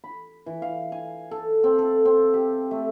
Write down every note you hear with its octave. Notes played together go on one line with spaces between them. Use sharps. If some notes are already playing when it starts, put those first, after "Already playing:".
B5
E3
F5
G#5
A4
C4
A4
C4
G4
A3